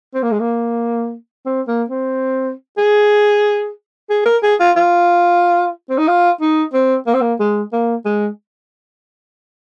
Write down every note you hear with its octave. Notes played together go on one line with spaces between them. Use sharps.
C4
A#3
G#3
A#3
C4
A#3
C4
G#4
G#4
A#4
G#4
F4
F4
C4
D#4
F4
D#4
C4
A#3
C4
A#3
G#3
A#3
G#3